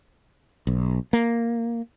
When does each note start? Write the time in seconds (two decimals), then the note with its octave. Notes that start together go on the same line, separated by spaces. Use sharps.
0.67 B1
1.13 A#3